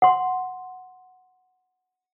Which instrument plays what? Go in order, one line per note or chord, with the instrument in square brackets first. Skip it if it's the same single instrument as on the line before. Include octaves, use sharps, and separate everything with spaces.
[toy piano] F#5 C6